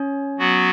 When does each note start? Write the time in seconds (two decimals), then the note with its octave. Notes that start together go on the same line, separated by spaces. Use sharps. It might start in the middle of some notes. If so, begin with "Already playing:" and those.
Already playing: C#4 C#5
0.38 F#3 B3 F#4